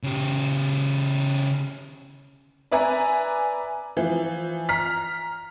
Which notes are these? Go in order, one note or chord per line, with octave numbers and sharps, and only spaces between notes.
C#3 G4
B4 D5 E5 G#5 A#5
E3 F3
A#5 F6 B6